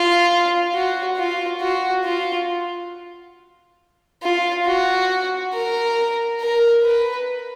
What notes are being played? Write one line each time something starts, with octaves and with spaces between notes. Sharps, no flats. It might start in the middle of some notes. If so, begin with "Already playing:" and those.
Already playing: F4
F#4
F4
F#4
F4
F4
F#4
A#4
A#4
B4